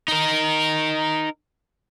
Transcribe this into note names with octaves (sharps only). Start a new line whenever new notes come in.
D#4 A#4